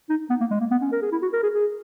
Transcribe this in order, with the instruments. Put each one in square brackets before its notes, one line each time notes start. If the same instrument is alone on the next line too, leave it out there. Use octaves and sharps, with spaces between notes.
[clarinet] D#4
B3
A#3
G#3
A#3
B3
C#4
A#4
G#4
E4
F#4
A#4
G#4
G#4